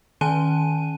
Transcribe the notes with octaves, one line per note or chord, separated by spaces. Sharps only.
D#3 C#4 G#5 A5 D#7